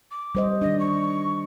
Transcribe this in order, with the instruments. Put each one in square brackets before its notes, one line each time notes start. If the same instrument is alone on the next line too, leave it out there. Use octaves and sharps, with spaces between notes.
[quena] D6
[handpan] G3 C5 D#5
[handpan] D#3 D4 [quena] D#5
[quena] C#6